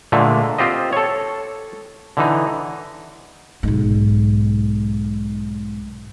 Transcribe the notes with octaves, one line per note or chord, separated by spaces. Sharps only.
A#2 D3 G#3 A3
C4 F4 G4 C5 D#5
A4 C#5
D3 E3 D#4
B1 G#2